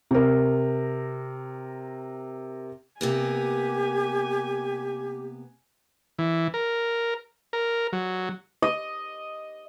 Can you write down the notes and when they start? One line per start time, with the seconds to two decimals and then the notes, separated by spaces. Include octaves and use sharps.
0.11 C3 A#4
3.01 C3 A#3 B3 G4 G#5
6.19 E3
6.54 A#4
7.53 A#4
7.93 F#3
8.62 D#5